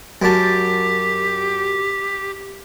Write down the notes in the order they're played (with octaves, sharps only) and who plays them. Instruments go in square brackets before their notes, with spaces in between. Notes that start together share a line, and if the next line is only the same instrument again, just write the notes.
[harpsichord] F#2 A5 [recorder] G4